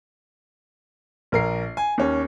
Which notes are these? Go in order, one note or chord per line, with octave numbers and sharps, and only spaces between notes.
A#1 A#4 C7
G#5
D#2 C#4